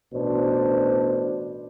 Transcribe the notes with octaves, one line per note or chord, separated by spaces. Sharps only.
A1 B2 D4 C5